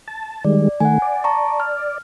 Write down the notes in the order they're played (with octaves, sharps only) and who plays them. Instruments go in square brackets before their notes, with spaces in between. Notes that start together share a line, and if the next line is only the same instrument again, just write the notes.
[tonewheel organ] A5
[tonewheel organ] D#3 G3 G#3 [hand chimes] D5
[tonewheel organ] D#3 A3 [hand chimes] F#5 G#5
[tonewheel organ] D5
[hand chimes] A5 A#5 C#6
F6